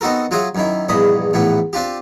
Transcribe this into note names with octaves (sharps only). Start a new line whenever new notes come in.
B3 C4 D#4 F#4 A4 A#4
F#3 F4 F#4 G#4 C#5 E5
F#2 D#3 E4
A#1 E2 G2 D#5 B5
A#1 A2 E3 B3
C4 D4 F4 G4